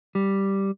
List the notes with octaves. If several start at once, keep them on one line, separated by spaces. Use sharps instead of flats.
G3